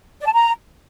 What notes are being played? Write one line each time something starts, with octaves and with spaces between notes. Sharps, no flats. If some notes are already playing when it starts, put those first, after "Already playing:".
D5
A5
A#5